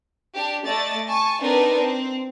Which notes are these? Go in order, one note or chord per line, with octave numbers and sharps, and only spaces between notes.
D4 G4
A3 D5 D#5 A6
G#5 A5 C#6
C4 D4 D#4 A#4 B4
C4